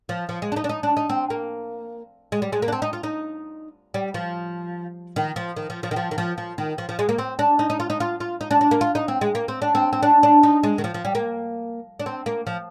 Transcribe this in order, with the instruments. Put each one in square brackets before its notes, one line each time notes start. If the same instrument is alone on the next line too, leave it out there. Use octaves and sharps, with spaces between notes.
[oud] F3
F3
G#3
D4
D#4
D4
D#4
D4
D#4
C4
A#3
G#3
G3
G#3
A#3
D4
C4
D#4
F4
D#4
G3
F3
D#3
F3
D#3
F3
F3
D#3
F3
D#3
F3
F3
D#3
F3
F3
G#3
A#3
C4
D4
D#4
D#4
F4
D#4
F4
F4
D#4
D4
D4
A#3
F4
D#4
C4
G#3
A#3
C4
D4
C4
C4
D4
D4
D#4
G#3
D#3
F3
F3
G3
A#3
D4
C4
A#3
F3